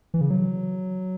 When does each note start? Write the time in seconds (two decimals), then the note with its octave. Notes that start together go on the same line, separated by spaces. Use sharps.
0.14 E3
0.21 C#3
0.30 F#3